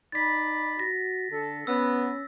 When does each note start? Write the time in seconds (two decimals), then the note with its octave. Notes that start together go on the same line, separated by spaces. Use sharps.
0.12 D#4 D5 B5 A6 B6
0.79 F#4 A#6
1.31 D3 A4
1.67 B3 C#4 E6